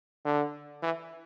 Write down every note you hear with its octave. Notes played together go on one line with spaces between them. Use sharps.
D3
E3